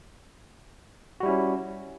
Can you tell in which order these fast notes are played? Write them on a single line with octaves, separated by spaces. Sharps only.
F#4 G3 E4 C#4